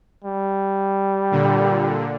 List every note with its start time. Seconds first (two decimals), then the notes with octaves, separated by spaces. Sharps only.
0.24 G3
1.31 A#2 D3